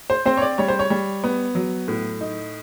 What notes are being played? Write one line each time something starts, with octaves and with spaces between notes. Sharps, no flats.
C5
C4 C5
C#5
D5
G3 C#5
C5
C#5
G3
B3
F#3
A2
D#4